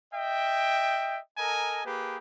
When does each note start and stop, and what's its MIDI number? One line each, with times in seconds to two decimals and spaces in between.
0.13 1.18 75
0.13 1.18 76
0.13 1.18 79
1.37 1.80 69
1.37 1.80 70
1.37 1.80 75
1.37 1.80 80
1.37 1.80 82
1.84 2.17 58
1.84 2.17 67
1.84 2.17 68
1.84 2.17 71